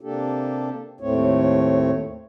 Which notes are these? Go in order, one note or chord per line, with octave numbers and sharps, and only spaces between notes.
C3 A#3 D4 G4 A4
D#2 A2 A3 C4 C#5